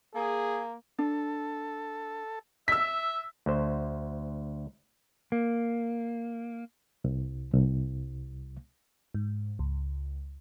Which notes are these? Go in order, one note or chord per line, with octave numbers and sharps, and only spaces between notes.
A#3 G#4
D4 A4
E5 E6 B6
D2 C5
A#3
C2
C2
G#2
C#2